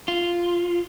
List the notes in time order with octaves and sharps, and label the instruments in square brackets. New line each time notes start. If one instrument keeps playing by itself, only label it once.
[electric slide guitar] F4